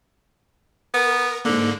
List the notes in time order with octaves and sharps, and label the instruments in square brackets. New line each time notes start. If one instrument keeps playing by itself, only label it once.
[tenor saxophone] B3 [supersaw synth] A#4
[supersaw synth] G#2 A#3 [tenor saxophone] D3